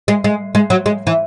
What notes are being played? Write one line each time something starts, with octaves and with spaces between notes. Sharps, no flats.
G#3
G#3
G#3
F#3
G#3
E3